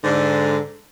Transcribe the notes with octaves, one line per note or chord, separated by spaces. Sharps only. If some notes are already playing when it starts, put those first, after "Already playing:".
G#2 D3